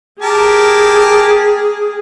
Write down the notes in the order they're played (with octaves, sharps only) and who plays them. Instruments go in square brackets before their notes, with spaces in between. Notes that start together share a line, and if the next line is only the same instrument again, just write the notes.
[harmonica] G4 A#4 A5 [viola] G#4